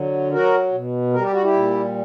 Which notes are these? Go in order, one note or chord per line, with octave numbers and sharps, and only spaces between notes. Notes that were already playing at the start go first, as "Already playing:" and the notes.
Already playing: D3 F#3
F#3 F#4 A#4
B2
G3 A#4
G4
F#4
E4 G4
A#2